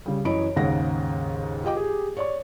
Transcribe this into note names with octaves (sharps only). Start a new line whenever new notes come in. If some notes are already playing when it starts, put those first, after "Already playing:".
C#3 G3
F#2 E3 C#5 D#5 B5 D7
D#2 G#2 C#3 G#4 F#5 A#6
F4 G4 D#5 G5 D6
G4 G#4
C#5 D5 C#6